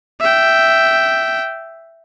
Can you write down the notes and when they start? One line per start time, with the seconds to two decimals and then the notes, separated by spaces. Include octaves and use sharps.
0.21 E5 G5